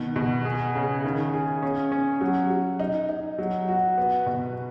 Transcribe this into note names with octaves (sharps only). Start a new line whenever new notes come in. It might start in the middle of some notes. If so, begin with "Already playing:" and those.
Already playing: B2 D#3
B2
G#4
C#3
D#3
G#4
C#4
C#4
F#3
F#3
D#4
D#4
F#3
F#4
B3
B2